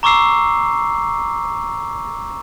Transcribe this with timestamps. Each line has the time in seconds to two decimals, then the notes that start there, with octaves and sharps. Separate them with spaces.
0.03 A#5 C#6 D6 E6 C7